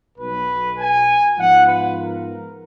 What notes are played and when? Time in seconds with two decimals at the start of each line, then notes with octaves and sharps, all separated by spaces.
0.18 B1 B2 F#3 B4
0.78 G#5
1.37 G#2 F3 B3 F4 F#5
1.67 B4
1.98 A#4